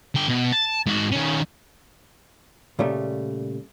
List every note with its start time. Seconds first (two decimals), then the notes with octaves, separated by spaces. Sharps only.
0.15 D3 G5
0.28 B2
0.52 A5
0.86 G#2 F#4
1.12 D#3 C#4
2.79 A#2 C#3 G3 A3